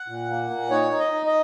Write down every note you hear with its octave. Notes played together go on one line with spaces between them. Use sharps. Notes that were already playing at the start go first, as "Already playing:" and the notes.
Already playing: F#5
A#2
A#3
A#2
D#4 C#5
D#4
D#5
D#4
D#5